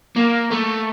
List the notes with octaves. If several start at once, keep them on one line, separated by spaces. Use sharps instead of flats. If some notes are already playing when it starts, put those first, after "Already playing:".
A#3
A3